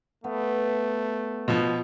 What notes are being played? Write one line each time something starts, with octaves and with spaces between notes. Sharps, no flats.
A3 B3 B4 F5
B2 F3